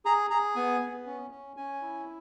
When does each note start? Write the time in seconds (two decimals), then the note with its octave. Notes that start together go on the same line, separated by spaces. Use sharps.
0.05 G#4 A#5
0.30 G#4 A#5
0.56 B3 G#5
0.81 B3
1.06 C#4
1.31 C#4
1.57 C#4 G#5
1.82 E4